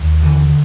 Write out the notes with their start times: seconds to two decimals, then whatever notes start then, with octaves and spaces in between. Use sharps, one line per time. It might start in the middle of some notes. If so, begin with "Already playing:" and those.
Already playing: D#2
0.23 D3 E3